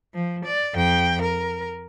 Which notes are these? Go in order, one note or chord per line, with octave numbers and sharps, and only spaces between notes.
F3
D5
F2 G5
A#4